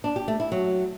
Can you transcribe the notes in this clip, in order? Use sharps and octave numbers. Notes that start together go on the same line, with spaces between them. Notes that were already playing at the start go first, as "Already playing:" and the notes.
D4
G4
A3
E4
F#3